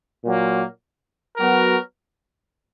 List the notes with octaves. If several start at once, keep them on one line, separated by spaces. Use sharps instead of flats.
A#2 F#3 A#3
F#3 B3 F#4 A#4